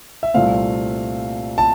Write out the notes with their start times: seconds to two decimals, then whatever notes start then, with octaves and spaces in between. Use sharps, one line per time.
0.23 E5
0.34 C2 A#2 A3 C4 F5
1.58 A5